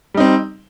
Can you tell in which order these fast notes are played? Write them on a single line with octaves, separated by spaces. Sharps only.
G3 D#4 C4